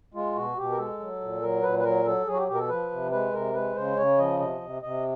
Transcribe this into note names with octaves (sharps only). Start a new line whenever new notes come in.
G#3 F4
B2 F#4
B2 G4
A#4
G#3 A4
F#3
A#2
F#3 A#4
A#2 B4
B4
F#3 A#4
F#3 A4
F#3 G#4
F#4
G4
B2 G4
A#4
A4
F3 B4
C3
G#3 B4
C3 A#4
G#3 B4
C#3 C5
C#3 C#5
F3 D#5
C3 D#5
C3
C3 D#5